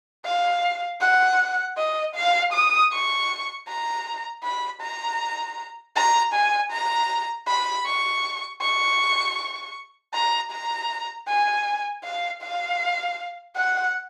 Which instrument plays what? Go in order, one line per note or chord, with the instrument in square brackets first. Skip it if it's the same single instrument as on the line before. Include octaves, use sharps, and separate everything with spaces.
[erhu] F5
F#5
D#5
F5
D#6
C#6
A#5
B5
A#5
A#5
G#5
A#5
B5
C#6
C#6
A#5
A#5
G#5
F5
F5
F#5